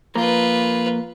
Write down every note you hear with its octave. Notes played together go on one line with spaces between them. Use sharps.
F3 A#3 F4 A#4 B4